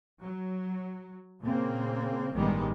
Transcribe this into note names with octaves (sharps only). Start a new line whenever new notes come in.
F#3
A#2 C#3 A#3 C4
A1 G2 D#3 G3 G#3 B3